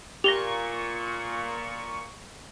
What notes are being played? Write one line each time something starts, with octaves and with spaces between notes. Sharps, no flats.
A#2 G4 C#6 A#6 F7 G7